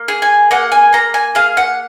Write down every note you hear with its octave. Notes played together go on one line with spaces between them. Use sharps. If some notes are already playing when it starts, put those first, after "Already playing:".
Already playing: A#3
G#4
G#5
A#3 F#5
G#5
A#3 A#5
G#5
G#4 F5
F#5